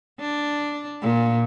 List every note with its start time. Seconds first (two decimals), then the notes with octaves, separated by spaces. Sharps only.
0.20 D4
1.02 A#2